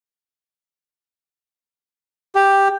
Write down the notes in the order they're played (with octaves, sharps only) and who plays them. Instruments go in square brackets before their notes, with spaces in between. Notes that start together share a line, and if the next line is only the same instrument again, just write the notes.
[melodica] G4